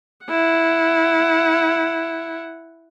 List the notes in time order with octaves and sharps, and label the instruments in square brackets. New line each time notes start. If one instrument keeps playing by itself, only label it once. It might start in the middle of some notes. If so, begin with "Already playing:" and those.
[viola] E4 F#5